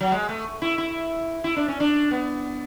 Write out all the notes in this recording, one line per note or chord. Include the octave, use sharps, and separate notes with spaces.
F#3
G#3
A3
E4
E4
E4
D4
C#4
D4
B3